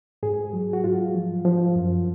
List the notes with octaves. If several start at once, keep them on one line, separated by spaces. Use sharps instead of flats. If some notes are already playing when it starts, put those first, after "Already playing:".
G#2 G#4
F#3
F#4
G#2 F4
F3
F3
F#2